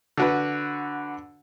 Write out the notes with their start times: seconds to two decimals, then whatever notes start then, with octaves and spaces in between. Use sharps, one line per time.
0.17 D3 F#4 B4